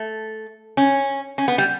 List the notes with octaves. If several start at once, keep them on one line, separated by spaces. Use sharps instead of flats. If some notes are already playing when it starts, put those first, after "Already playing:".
Already playing: A3
C#4
C#4
B3
G3